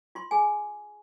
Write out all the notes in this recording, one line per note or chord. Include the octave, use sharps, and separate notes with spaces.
F4 C6
G#4 G#5